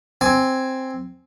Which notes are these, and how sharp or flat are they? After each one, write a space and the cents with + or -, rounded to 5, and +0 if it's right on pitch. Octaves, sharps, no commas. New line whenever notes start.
C4 +0 G#5 +0